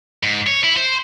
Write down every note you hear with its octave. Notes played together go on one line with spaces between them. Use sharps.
G#2
C#5
E4
C5